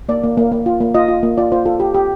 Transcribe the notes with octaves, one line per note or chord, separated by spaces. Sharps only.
A#3 D5
A#3
A#3
A#3
F4
A#3
F4 D#5
F4
A#3
F4 D5
F4 C5
F4 A4
G4
G4